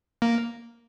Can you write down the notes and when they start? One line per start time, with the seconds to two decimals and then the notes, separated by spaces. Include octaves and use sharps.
0.22 A#3